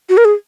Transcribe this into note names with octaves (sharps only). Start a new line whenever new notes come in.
F#4
A#4
G#4